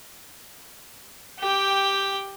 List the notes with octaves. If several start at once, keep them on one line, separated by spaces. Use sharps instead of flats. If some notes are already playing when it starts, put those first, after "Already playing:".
G4 G5